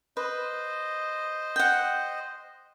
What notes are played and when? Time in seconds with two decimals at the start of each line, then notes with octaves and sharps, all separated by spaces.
0.17 B4 C5 D#5
1.56 F#5 G5